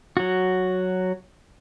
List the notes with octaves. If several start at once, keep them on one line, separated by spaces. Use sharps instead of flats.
F#3 F#4